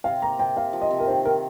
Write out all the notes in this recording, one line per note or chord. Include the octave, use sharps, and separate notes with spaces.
C3 F5
A#3 A#5
C3 G5
C3 F5
F3
D#5
C3
A#4
D#3 C5
D#3 A#4